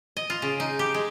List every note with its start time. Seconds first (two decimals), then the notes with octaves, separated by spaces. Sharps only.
0.17 D#5
0.30 F4
0.42 C#3
0.60 D#4
0.79 G4
0.94 G#3